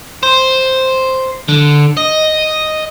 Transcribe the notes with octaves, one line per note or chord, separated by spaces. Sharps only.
C5
D3
D#5